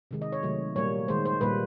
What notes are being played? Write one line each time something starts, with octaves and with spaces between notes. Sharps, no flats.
C3 D#3 G#3
D#5
C#5
C3 D#3 F#3 A3
A#2 G3 A#3 C#5
D#3 G#3 C5
C5
A#2 G3 A#3 B4